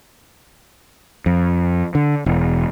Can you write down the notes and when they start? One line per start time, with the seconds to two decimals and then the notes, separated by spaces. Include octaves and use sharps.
1.26 F2
1.95 D3
2.26 E1